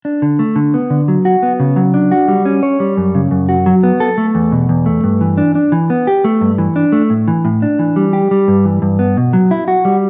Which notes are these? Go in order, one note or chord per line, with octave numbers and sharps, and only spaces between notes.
D4
D3
A3
D3
B3
D3
F#3
F#4
B3
C#3
F#3
D4
F#4
G3
C#4
C#5
G3
F#2
C#3
F#2
F#4
F#3
B3
A4
A3
E2
B2
E2
A3
G2
E3
D4
D4
E3
B3
G4
A3
G2
E3
D4
A3
A2
E3
A2
D4
E3
G3
G4
G3
G2
E3
G2
B3
B2
F#3
E4
F#4
G3